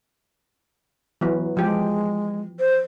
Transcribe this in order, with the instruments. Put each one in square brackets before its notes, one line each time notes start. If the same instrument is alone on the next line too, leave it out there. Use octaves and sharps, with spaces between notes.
[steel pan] E3 F#3 B3
[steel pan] F3 G4 [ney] G#3
[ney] C5